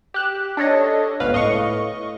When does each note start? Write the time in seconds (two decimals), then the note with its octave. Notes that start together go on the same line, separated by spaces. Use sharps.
0.14 G4 F#6 E7
0.57 D4 A4 C#5 D#5
1.20 G1 C#2 B4 F5
1.33 A2 D#5 F5 C#6 C#7